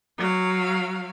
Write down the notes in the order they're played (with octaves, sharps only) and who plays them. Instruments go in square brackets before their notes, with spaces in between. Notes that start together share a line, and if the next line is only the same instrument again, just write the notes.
[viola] F#3 F5